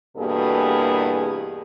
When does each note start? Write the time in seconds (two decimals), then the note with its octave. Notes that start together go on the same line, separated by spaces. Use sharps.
0.17 E2 G2 B2 A#3 G#4 A4